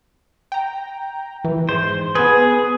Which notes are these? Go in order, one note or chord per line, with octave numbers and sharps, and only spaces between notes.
G5 A#5
E3
G#2 C5
B3 G#4 B4